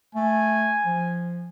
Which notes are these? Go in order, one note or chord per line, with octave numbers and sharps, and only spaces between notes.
A3 G#5
F3